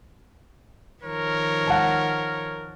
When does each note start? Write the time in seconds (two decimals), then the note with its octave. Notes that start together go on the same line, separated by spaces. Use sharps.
1.03 D#3 F3 A#4 C#5
1.67 F#5 A5